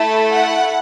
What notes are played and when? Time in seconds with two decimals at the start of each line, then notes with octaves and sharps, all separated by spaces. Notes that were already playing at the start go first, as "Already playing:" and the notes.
Already playing: A3 E4 A4 A5
0.32 F#5